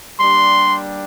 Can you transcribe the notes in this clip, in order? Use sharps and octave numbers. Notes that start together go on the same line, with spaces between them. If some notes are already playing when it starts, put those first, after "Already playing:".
G3 A#3 D4 G4 C6